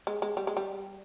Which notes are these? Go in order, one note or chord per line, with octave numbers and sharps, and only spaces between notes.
G#3
G#3
G3
G#3
G3